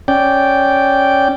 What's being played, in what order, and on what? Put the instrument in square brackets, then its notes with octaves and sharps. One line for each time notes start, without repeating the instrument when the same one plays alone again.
[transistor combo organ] C#4 D5 G5